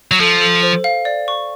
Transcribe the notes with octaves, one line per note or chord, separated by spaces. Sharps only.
F#3
F3 A4
A4
C5
F5
D5
C#6